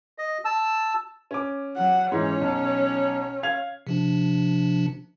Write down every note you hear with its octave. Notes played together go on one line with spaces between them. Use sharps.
D#5
A5 E6
C#4 D6
F#3 F#5
G#2 E3 C#4 D#4 C#5
B1
F5 G#6 F7
C3 F3 D4